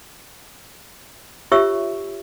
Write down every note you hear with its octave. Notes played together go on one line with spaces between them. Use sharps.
F4 G4 C#5 E5 C#6 E6